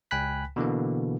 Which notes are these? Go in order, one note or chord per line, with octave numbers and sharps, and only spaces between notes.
C#2 G5 G#5 B5 F#6 B6
B2 D3 E3 A#3